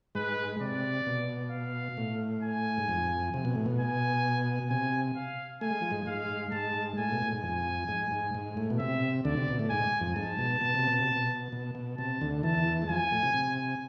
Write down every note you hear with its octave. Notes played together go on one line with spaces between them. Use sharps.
G#2 G#3 B4
C3 D5
B2
F5
A2
G#5
G#2
F2
C3
B2
A2
B2
G#5
C3 G#5
F5
A3 G#5
G#3
F3
G#2 G#3
G#2 G#3 F5
G#2 G#3 A5
A2 G#5
B2
A2
G#2
F2 G#5
G#2
G#2
G#2
A2
B2
C3 E5
D2 D3 D5
C3
B2
A2
G#2 G#5
F2
G#2 A5
B2
B2
C3
B2
C3
B2
B2
B2
C3 A5
D2 D3
E2 E3 A5
G#3
F2 F3 G#5
A2
C3
C3